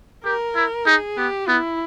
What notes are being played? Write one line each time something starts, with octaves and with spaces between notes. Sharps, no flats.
G4 A#4
E4
D#4 G#4
B3 G4
B3 E4